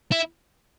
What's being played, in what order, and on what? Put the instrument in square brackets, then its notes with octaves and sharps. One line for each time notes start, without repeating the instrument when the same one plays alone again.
[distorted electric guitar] E4